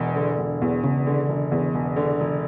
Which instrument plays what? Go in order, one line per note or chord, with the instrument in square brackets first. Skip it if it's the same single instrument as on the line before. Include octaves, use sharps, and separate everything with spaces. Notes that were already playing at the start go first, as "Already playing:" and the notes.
Already playing: [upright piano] E1 E2 [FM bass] B2
[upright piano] D3
E1
E2
[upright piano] E1 [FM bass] C#3
[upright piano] D3
E1
E2
E1
D3
E1